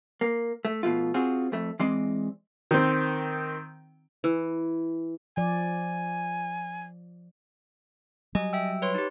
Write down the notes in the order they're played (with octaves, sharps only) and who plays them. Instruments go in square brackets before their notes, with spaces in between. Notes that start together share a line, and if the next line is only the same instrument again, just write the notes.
[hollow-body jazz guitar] A#3
A3
B2 F3 A3 F4
C4 F4 F#4 G#4
F2 A3
E3 G#3 C4 D5 D#5
[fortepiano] D#3 C4
[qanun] E3
[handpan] F3 D5 [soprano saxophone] G#5
[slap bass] F#3 G3 [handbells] D#5 G#5
[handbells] E5 G5 E6
B4 C#5 C6
D#4 G4